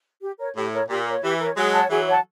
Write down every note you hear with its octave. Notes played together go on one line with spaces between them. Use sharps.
G4
A#4 C#5
A2 G4
A#4 C#5
A#2 G4
A#4 C#5
E3 G4
A#4 C#5
F#3 G#3 G#4
C#5 F#5 A5
E3 F#3 G#4
C#5 F#5 A5